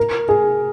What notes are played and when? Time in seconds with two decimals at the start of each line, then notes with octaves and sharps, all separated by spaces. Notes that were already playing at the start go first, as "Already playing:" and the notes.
Already playing: A#4
0.29 G#4